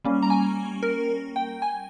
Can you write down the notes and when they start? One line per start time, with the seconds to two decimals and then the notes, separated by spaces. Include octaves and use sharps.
0.05 G3 A#3 C#4
0.22 A#5
0.30 G#5
0.83 A#4
1.36 G5
1.62 G#5